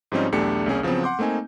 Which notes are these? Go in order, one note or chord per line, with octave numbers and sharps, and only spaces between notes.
G#2 F3 G3 C4 C#4 D#4
B1 E2 A3 D4 G4 C#7
C2 A#3 C#4 G#4
C#3 F3 F#3 B3 C4
F#5 C6 D6 G6
A3 A#3 C4 D#4 G#5